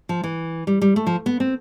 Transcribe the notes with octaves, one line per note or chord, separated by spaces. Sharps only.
F3
E3
G3
G3
A3
F3
B3
C4